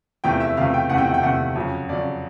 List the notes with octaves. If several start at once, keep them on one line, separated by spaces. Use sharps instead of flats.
E2 C3 F3 A3 G5
E5
E2 C3 F3 A3 F5
G5
E2 C3 F3 A3 F#5
G5
F#5
G5
E2 C3 F3 A3 F#5
F2 C#3 F#3
F2 C#3 F#3 D5